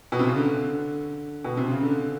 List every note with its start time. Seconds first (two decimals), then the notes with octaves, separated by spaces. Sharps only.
0.12 B2
0.19 C3
0.28 C#3
0.36 D3
1.45 B2
1.57 C3
1.71 C#3
1.82 D3